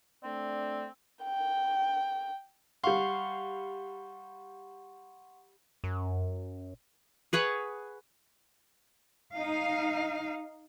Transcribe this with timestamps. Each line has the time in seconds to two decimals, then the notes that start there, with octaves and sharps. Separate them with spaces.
0.23 A3 C4 D4 D5
1.24 G5
2.84 G3 F5 F#5 C6 C#6
5.84 F#2
7.33 G#4 B4 C#5 F#5
9.36 D#4 F5